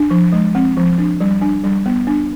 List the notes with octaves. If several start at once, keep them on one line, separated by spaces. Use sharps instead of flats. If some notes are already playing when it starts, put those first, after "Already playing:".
Already playing: D4
F3
G#3
C4
F3
D4
G3
D4
G3
B3
D4